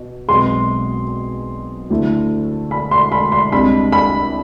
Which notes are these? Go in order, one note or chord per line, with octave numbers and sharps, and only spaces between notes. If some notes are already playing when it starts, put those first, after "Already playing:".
Already playing: B2
B1 B2 G#3 C4 G#4 C6
D2 D3 A3 E4
B5
C6
B5
C6
C2 C3 G#3 D4 B5
B5